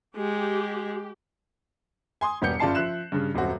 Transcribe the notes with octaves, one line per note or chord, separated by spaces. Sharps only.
G#3 G4
G#5 C6 D#6
E1 G3 B3 G4 G6 C#7
F#1 C#3 F4 D5 A5 C7
F3 E5 F#6 E7
G2 C#3
D#1 F#2 C4 F#4